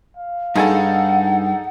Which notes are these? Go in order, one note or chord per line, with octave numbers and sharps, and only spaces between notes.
F5
G2 D#4 G#4 A4 F#5